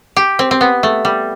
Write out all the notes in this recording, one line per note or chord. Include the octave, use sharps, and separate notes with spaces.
G4
C4
C4
B3
A3
G3